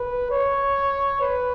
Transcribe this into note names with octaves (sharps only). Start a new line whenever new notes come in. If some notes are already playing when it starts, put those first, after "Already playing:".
Already playing: B4
C#5
B4